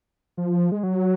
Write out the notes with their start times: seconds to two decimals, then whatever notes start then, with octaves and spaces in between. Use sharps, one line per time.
0.37 F3
0.72 G#3
0.83 F#3